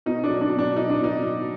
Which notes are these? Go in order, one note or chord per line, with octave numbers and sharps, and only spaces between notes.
B2 D#4
D4
F#3
D4
B2
D4
F#3 D#4
D4
B2 D#4
F#3